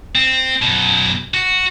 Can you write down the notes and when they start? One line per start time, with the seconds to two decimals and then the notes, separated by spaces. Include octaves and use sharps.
0.15 C4
0.62 F#2 B2
1.34 F#4